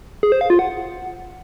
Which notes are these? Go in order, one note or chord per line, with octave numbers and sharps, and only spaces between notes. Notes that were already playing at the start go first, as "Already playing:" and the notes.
G#4
C5
F5
F4
F#5